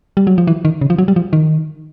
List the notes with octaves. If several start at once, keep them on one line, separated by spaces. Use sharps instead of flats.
G3
F#3
F3
E3
D#3
C#3
F3
F#3
G3
F3
D#3